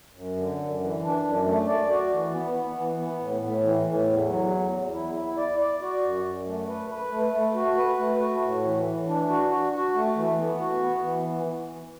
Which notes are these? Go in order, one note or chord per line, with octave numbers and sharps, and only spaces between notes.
F#2
D3
F#2
E3
D4
F#2
A3
D5
F#4
E3
B3
B3
E3
B3
A2
A2
E3
A2
E2
F#3
E2
E2
E4
E4
D5
D5
F#4
F#2
F#2
A3
B4
B4
A3
A3
F#4
B4
A3
F#4
A2
E3
E3
D4
F#4
F#4
F#4
A3
E3
B3
F#4
B3
E3